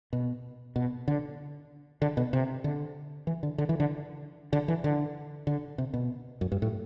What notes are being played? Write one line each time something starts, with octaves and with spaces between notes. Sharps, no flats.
B2
B2
D3
D3
B2
C3
D3
E3
D3
D3
E3
D3
D3
E3
D3
D3
C3
B2
F#2
G2
A2